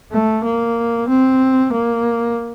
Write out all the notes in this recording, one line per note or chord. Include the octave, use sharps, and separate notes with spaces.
A3
A#3
C4
A#3